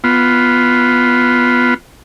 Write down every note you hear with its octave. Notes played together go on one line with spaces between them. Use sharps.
B3 F4